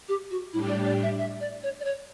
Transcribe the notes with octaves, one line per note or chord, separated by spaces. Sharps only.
G4
F#4
A2 G3 D4 E4 G4
D5
D5
E5
E5
D5
C#5
D5
C#5